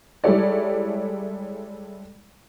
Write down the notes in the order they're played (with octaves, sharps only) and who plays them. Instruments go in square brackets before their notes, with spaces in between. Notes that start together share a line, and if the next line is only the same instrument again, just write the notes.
[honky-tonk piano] G3 G#3 E4 A4 C#5 D5